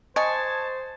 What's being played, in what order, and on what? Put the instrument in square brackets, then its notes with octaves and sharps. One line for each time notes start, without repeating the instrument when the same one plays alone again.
[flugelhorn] C5 [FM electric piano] D#5 G#6 [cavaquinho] G#5 C#6 [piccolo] A5